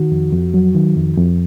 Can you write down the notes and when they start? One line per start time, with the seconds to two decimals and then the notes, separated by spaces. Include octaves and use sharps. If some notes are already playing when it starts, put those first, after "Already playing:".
Already playing: D#3 F#4
0.12 F2
0.33 F2
0.54 F#3
0.75 D#3
0.96 F2
1.17 F2